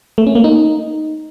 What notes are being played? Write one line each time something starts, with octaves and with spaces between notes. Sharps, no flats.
A3
C#4
A#3
D#4